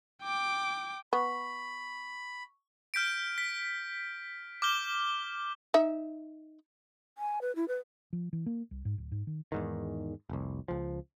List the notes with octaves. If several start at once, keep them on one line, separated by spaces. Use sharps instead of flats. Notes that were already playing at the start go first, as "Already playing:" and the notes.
G5 D6
B3 B5 C#6
F6 G6 B6 D7
B6
D6 F6 G6 G7
D#4 E5
G#5
B4
E4
B4
F3
E3
A#3
C2
G#2
D1
G#2
D#3
E2 G#2 D#3
F1 C2
C#2 F3